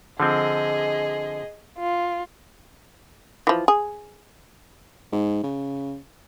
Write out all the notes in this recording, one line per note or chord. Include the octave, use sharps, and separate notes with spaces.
D3 F3 C4 G#4 D#5
F4
E3 F3
G#4
G#2
C#3